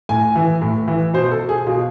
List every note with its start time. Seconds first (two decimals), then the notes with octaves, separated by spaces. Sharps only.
0.09 A2 G#5
0.35 E3
0.62 A2
0.88 E3
1.14 B2 C5
1.31 A4
1.49 G#4
1.66 B2 F4